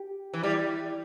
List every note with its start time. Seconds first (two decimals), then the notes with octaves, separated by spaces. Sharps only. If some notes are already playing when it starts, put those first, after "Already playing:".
Already playing: G4
0.34 E3
0.43 G3 E4